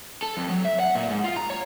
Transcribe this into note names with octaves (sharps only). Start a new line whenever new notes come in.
A4
F2
F#3
E5
F#5
A#2
G#2
F4
A#5
C#5